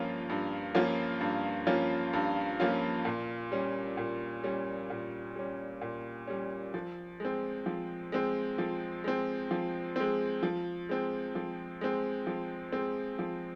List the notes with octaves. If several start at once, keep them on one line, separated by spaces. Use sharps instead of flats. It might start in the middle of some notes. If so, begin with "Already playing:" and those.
Already playing: G2 F3 A#3 C#4 F4
G2
F3 A#3 C#4 F4
G2
F3 A#3 C#4 F4
G2
F3 A#3 C#4 F4
A#2
G3 C#4
A#2
G3 C#4
A#2
G3 C#4
A#2
G3 C#4
F3
G#3 C4
F3
G#3 C4
F3
G#3 C4
F3
G#3 C4
F3
G#3 C4
F3
G#3 C4
F3
G#3 C4
F3